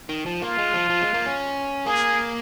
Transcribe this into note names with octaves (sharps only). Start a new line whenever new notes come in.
D#3
F3
A#3 F4
G#3
F3
F3
G#3
A#3
C#4
A#3 G#4